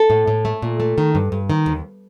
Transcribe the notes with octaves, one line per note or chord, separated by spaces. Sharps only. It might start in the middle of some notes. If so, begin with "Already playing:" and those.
Already playing: A4
A2
A2
A3
A#2
A3
D#3
G2
G2
D#3
D#2